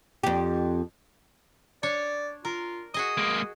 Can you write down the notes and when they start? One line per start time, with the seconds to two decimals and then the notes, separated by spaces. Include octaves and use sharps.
0.23 F2 G4
1.83 D4 C#5 D5
2.45 F4 A#4
2.94 F#4 G#4 D#5 D#6
3.17 G#3 A#3